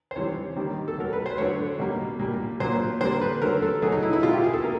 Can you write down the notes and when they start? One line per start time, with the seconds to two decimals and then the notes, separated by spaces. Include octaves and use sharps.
0.11 C5
0.16 C3 E3 G3 C#5
0.56 D#3 G3 A#3
0.88 A4
0.98 B2 F#3 A3 A#4
1.13 B4
1.26 C5
1.38 D3 F#3 A3 C#5
1.79 B2 G3 A#3
2.19 A#2 G3 A#3
2.60 A#2 F#3 A#3 C5
3.01 D3 G3 A#3 C5
3.21 B4
3.41 D3 F#3 A3 A#4
3.62 A4
3.82 B2 F#3 A3 G#4
3.92 D#4
4.03 E4
4.13 E4
4.23 B2 G#3 F4
4.33 G4
4.44 G#4
4.53 A4
4.64 A#3 A#4